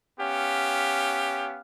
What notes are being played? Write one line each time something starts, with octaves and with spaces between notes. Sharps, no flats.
B3 C#4 G4 F5